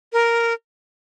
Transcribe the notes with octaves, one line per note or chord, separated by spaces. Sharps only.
A#4